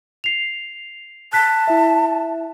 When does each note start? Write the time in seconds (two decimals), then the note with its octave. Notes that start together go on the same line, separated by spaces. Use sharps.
0.24 C7 F7
1.33 A5 F#6 B6
1.68 E4 E5